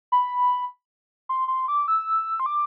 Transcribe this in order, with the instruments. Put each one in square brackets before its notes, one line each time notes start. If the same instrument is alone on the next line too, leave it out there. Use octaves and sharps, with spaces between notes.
[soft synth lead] B5
C6
C6
D6
E6
C6
D6